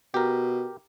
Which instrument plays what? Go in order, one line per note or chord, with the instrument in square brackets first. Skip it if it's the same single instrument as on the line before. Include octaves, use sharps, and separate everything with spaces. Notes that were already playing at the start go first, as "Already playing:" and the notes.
[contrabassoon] B2 [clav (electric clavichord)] G4 A#4